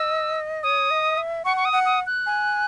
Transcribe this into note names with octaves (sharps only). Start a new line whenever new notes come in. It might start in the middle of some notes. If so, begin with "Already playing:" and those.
Already playing: D#5 E6
C#5 D#6
D#5
E5
F#5 C#6
C#6
D#6
F#5
D#6
F#6
G#5